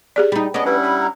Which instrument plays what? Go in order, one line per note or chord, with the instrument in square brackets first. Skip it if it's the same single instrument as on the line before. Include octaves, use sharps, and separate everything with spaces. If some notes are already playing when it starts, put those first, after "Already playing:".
[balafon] G4 G#4 D5
[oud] G3 D#4
[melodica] B3 D#5 [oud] C#4 D4
[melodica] G3 E4 F#5 [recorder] B4
[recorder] B5
A#5